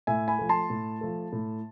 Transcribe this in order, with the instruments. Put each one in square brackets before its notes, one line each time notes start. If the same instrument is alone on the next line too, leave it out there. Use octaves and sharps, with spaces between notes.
[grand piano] A2 E5 G#5
G#5 B5
F3 A3
A5 C6
A2
F3 A3
A2